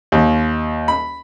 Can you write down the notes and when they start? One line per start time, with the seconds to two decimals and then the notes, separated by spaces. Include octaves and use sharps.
0.12 D#2
0.88 B5